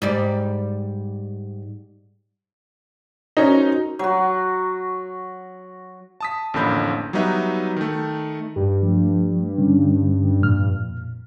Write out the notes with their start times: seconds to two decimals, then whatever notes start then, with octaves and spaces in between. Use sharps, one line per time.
0.02 G#2 G3 D5
3.37 C#4 D#4 F#4 A#4 C5
3.99 F#3 F#4
6.20 A5 D#6 B6
6.54 A1 F2 D3 A#3 B5 G6
7.13 F#3 G3 B3 D#4 B4 E5
7.76 D#3 A3
8.56 G2 G4
8.83 F3 A3
9.58 D3 G3 C#4
10.40 F2 A#2 F6